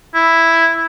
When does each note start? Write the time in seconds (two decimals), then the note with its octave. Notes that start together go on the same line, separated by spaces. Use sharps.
0.15 E4